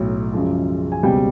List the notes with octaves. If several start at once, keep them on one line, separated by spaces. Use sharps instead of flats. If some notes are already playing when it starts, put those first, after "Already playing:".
Already playing: B1 A2 F#3
F#2 C#3 F3 G#3
G#5
C#2 B2 G3 C4 G5